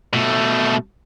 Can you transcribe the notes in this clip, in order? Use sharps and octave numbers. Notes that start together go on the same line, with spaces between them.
B2 A3